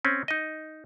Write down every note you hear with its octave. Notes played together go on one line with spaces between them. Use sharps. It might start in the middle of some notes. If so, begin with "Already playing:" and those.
C4 C#4
D#4 D#5